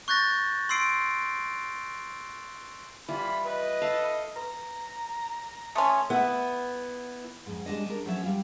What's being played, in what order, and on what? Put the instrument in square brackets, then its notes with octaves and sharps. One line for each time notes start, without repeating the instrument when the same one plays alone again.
[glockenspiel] C#6 F#6 G6 A6 A#6
C6 E6 C7 D7
[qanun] E3 G3 F4 [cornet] B5
[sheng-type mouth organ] B4 [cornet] D#5
[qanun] A4 E5 F5
[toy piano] B4 [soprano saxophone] A#5
[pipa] A3 C#4 [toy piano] A5 C6 D#6
[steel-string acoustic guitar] B3 E4
[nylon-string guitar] F2 G#2
G3 G#3 D4 D#5
D4 A#4
F3 F#3 A3 C#4 E5
G3 F4